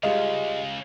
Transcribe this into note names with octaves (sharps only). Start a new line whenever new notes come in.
C#2 C#3 G3 G#3 F4 D#5 F5